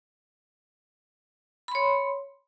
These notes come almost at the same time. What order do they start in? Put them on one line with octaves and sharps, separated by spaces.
B5 C6 C#5